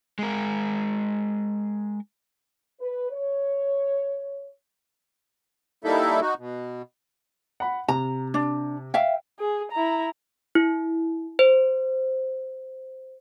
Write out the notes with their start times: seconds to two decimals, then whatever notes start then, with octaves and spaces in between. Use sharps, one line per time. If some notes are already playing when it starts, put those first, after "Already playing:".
0.19 G#3 A#4
2.80 B4
3.10 C#5
5.84 G3 A#3 D#4 E4 A4 E5
6.21 D#4 F#4
6.38 B2
7.60 F#5 B5
7.88 C3 A#5
8.34 D4
8.94 E5 F5 G5
9.39 G#4
9.72 E4 A#5
10.55 E4
11.39 C5